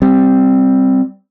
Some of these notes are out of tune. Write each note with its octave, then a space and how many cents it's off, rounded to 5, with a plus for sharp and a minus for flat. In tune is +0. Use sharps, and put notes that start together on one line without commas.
G3 +0 C4 +0